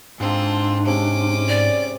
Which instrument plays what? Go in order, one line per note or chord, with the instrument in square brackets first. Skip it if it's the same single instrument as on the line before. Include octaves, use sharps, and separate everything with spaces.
[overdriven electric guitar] G#2 [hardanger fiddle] C4 F4 [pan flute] D4 [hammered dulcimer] A4 B4
[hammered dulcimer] C3 G#3 [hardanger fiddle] C#4 D6
[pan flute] D5